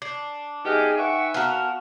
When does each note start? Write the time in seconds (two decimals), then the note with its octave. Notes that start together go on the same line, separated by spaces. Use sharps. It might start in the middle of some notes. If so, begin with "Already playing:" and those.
0.02 D4 C7
0.65 E3 B3 D#4 G4 G#4 D#5 G#5 F6
0.98 B4 E5 F#5 G5 C#6
1.34 B3 F#4 A#4 F5 F#5 A5 F6